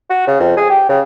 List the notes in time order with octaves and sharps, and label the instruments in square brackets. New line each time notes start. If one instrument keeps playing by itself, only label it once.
[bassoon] F#4
C#3
F2
G#4
G4
C#3